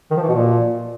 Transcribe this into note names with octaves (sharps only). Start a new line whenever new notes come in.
D#3
F3
E3
B2
A#2